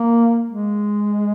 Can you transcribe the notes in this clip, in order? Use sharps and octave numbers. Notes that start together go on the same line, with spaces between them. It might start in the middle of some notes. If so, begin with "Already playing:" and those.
Already playing: A#3
G#3